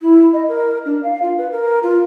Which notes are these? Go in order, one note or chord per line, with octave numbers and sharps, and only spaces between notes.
E4
D#5
A#4
D4
F5
F4
B4
A#4
F4